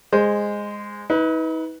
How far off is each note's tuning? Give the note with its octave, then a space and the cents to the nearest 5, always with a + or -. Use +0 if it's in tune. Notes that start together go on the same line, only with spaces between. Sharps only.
G#3 -10 C5 +0
D#4 +45 B4 +0